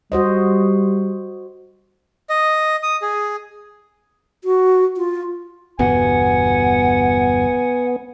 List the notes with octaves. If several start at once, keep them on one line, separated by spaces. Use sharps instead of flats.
G3 F#4 C5 D#5
D#5
D#6
G#4
F#4
F4
G1 E2 B2 B3 F#5 G#5